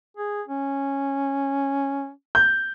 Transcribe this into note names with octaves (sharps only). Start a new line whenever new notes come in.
G#4
C#4
G6